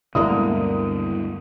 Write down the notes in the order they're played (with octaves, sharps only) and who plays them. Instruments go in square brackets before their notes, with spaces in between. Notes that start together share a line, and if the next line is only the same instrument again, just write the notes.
[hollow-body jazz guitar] D2 D3 A#3 [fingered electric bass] G2 B2 [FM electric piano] G#3 E4 [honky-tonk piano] D#6